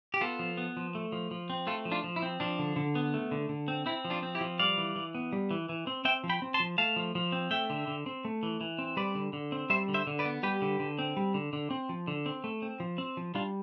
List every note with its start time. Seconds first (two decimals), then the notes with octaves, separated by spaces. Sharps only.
0.14 G4
0.21 B3 F4 A4
0.39 F3
0.57 B3
0.77 F3
0.95 A3
1.12 F3
1.31 F3
1.50 C4
1.67 A3 F4 A4
1.85 F3
1.92 D4 F4
2.04 F3
2.16 E4
2.22 C4
2.40 F3 D4
2.59 D3
2.76 D3
2.95 B3
3.14 A3
3.31 D3
3.49 D3
3.68 C4
3.86 C4 E4
4.05 F3
4.10 D4 F4
4.23 C4
4.35 E4 G4
4.41 F3
4.59 G3 D5 F5
4.78 E3
4.96 E3
5.15 B3
5.33 G3
5.51 E3
5.69 E3
5.87 C4
6.05 C4 E5 G5
6.24 F3
6.29 G5 B5
6.42 C4
6.54 A5 C6
6.60 F3
6.78 A3 F5 A5
6.96 F3
7.15 F3
7.32 C4
7.51 A3 E5 G5
7.70 D3
7.88 D3
8.06 C4
8.25 A3
8.43 E3
8.61 E3
8.79 C4
8.97 G3 B4 D5
9.15 D3
9.33 D3
9.52 C4
9.70 G3 C5 E5
9.88 D3
9.94 C5 E5
10.07 D3
10.19 B4 D5
10.25 B3
10.43 G3 G4 B4
10.62 D3
10.80 D3
10.99 C4
11.17 G3
11.34 D3
11.53 D3
11.71 C4
11.89 F3
12.07 D3
12.26 C4
12.44 A3
12.62 C4
12.80 F3
12.98 C4
13.17 F3
13.35 G3 D4 F4